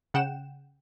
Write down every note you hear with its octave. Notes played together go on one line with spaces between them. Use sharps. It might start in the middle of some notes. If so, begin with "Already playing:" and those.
C#3 F#5 G5 E7